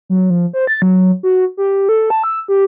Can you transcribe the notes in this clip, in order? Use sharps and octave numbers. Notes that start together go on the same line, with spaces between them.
F#3
F3
C5
A6
F#3
F#4
G4
A4
A5
E6
G4